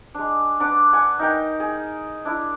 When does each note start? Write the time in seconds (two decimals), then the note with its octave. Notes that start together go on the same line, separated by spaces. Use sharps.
0.14 G#3 D4
0.60 D4 B4 F#5 D6
0.93 F#5 G#5
1.19 D#4 A#4 G5
1.60 G#4
2.25 D4 E4